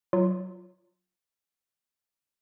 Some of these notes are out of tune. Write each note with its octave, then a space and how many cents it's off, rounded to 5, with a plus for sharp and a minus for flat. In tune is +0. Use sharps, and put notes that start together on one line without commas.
F#3 +0 F4 +5